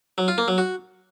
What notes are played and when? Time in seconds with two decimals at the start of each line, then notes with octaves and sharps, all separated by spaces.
0.18 F#3
0.28 F4
0.38 A#3
0.48 F#3
0.58 F#4